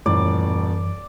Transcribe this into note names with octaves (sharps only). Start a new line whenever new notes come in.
D#1 F#2 A2 E3 D5